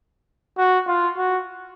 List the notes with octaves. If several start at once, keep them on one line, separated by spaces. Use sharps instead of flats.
F#4
F4
F#4